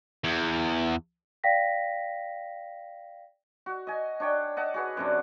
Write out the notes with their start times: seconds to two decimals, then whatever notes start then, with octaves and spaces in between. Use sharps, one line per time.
0.24 E2
1.44 D5 F5 G5 A#6 B6
3.66 F#4
3.87 D#5 G#5
4.20 D4 C#5 G5
4.57 D#5 F#5 A5
4.74 F#4 G#4 B4
4.97 F#2 C3 D4